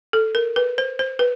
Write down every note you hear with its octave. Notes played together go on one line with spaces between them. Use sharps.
A4
A#4
B4
C5
C5
B4